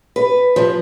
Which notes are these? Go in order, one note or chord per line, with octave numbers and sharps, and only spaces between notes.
B4
F3